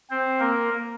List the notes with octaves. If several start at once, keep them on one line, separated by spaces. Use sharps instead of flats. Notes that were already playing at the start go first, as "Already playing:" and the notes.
C4 C5
A#3 A#4